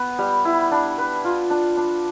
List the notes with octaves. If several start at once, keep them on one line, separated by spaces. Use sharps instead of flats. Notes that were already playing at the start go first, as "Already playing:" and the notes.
Already playing: B3 B4
G3
E4
D4
B4
F4
D4
D4